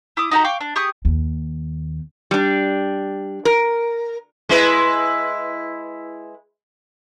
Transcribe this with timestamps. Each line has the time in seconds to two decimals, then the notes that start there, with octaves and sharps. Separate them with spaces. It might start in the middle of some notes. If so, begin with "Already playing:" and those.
0.17 E4 D6 D#6
0.31 D#4 F#4 G4 A#5
0.44 F5 G5 C#6 D6
0.61 D4
0.76 G4 G#4 C#6 D#6
1.05 D#2
2.31 G3 D4
3.45 A#4
4.49 G#3 E4 B4